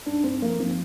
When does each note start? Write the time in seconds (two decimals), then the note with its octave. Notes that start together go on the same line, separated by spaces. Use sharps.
0.06 G2 D4
0.24 G2 C4
0.42 F3 A#3
0.60 F3 C4